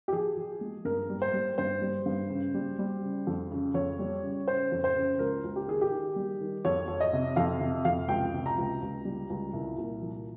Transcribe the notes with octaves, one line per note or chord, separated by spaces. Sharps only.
G4
F3 G#4
F3
G#3
G2 A#4
G3
C5
G3
G2 C5
G3
G2
C#3
G3
G3
C#3
F2
C#3
F2 C#5
G3
C#3
C#3 C5
F2
C5
C#3
C#2 A#4
C#2
G4
D#3 G#4
G4
D#3
G3
D#3
F2 C#5
F2
D#5
C3
F2 F5
C3
F2 F5
C#2 G5
C3
A#5
C#2
C#2
G3
C#2
C2
A#2
F3